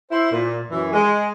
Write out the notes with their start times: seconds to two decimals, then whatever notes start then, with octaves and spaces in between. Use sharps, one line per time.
0.11 E4 C5
0.32 A#2
0.71 F#2 E3
0.93 G#3